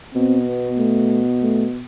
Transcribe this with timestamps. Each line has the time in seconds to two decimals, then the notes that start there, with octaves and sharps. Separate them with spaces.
0.15 B2 C4
0.47 B3
0.78 A3
1.42 A3